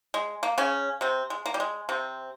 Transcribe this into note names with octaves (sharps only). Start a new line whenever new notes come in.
G#3
A#3
C#3 C#4
C3 C4
G#3
A#3
G3
G#3
C3 C4